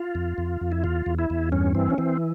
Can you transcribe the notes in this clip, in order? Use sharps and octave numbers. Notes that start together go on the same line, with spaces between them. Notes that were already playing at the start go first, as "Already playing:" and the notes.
Already playing: F4
F2
F2
F2
E4
E2 F4
E2
E4
E2
G2 C#4
E3 C4
C#4
E3 C4